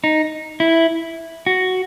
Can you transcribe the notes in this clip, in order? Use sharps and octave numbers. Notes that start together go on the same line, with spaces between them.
D#4
E4
F#4